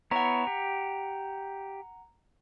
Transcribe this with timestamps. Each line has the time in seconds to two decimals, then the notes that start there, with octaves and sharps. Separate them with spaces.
0.11 B3 E4 C#5 F#5 A#5
0.47 G4